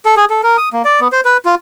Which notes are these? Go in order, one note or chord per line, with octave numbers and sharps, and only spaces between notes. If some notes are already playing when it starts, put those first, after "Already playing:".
A4
G#4
A4
A#4
D#6
A#3
D5
B3
C5
B4
F4